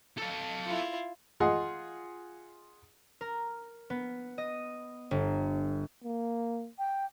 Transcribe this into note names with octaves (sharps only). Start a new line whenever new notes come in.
A4 F5
E4 F4
F4 G#4 D#5 F#5 C6
A#4
B3
D#5
G1
A#3
G5